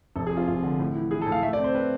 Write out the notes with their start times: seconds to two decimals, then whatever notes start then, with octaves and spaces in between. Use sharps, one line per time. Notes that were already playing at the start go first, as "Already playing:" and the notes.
0.15 F1 A4
0.27 G#4
0.32 F2
0.37 F4
0.48 F1 F4
0.64 D3
0.79 A2
0.95 E3
1.11 E3 G#4
1.22 A4
1.27 A2
1.32 F5
1.43 A3 E5
1.53 D5
1.59 C4
1.64 C5
1.75 C4 B4